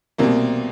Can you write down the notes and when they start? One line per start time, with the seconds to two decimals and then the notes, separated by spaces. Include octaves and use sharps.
0.18 C2 B2 A#3 C4